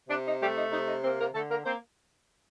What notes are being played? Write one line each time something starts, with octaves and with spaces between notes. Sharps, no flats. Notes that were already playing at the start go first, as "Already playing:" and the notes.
C3 D4
D#4
G3 A3 G4
D#4
C3 D#4
D#4
A#3 C4 C5
A#3 A#4
D3 A3 A4
A#3 A#4
A#3 C4 C5